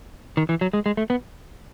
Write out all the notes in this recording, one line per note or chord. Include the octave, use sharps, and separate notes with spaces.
D#3
E3
F#3
G#3
G#3
A3
B3